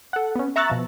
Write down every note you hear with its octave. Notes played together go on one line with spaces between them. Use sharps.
A4 F#5
B3 C#4
E5 A#5 C#6 E6 F#6 A6
B2 F3